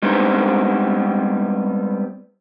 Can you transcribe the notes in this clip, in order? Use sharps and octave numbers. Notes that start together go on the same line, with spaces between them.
G3 G#3 B3 C4 D4 D#4